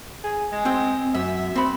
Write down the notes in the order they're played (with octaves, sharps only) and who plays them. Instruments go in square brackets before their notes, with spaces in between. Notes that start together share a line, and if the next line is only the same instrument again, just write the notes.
[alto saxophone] G#4
G#3
[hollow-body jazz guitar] C4 G5
[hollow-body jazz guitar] F#2 [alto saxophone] E5
[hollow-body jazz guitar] C4 B5